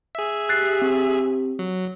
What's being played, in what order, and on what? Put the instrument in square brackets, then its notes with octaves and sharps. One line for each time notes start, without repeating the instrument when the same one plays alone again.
[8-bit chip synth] G#4 E5
[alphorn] G4 [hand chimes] F#6 A6 C7
[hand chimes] C4
[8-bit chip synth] F#3